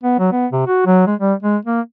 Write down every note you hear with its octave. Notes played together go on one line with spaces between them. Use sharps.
B3
F#3
B3
C3
F#4
F#3
G#3
G3
G#3
A#3